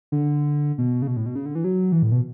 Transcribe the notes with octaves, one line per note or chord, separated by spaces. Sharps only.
D3
B2
C#3
B2
A2
B2
C#3
D3
E3
F#3
E3
A2
B2